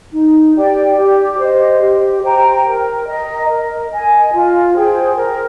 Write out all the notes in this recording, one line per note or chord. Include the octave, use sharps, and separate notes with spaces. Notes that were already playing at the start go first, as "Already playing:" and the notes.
D#4
G4 D5 G5
G4
C5 D#5
G4
C5 G5 A#5
A#4
D#5 A#5
A#4
D#5 G#5
F4
G#4 C5 G5
A#4